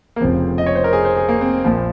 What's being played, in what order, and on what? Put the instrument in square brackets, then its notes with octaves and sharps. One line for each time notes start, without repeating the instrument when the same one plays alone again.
[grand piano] A#3
F1 F2 C#3 F3 C4
D#5
C#5
C5
A#4
G#4
C5
G#4
A#3
C4
A#1 A#2 F3